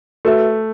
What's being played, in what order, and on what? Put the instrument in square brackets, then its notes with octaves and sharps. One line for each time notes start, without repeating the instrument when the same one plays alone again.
[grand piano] A3 [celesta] F#4 B4 E5